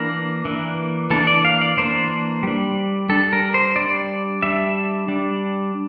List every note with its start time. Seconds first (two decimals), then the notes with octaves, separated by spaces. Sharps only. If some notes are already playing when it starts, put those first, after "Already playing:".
Already playing: E3 A#3 D4 A#4
0.45 E3 A#3 D4
1.10 E3 A#3 D4 A4
1.27 D5
1.45 F5
1.61 D5
1.77 E3 A#3 D4 C5
2.43 G3 D4
3.09 G3 D4 A4
3.33 A#4
3.54 C5
3.76 G3 D4 D5
4.43 G3 D4 E5
5.08 G3 D4